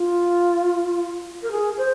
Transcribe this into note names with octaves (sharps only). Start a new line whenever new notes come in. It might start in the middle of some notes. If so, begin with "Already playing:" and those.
Already playing: F4
A#4
G#4
C5